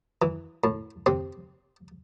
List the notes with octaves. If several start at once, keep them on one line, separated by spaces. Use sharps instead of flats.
E3
A2
C3 C4